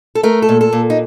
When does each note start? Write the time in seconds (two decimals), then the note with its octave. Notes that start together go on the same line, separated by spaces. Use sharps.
0.15 A4
0.23 A3 A#4
0.42 A4
0.49 A#2
0.61 A4
0.73 A#2
0.90 D#4